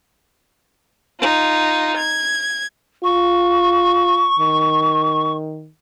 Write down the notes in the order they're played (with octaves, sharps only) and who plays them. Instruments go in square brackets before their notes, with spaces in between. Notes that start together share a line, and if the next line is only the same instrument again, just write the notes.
[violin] D#4 F4
G#6
[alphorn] F4 [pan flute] C#6
[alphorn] D#3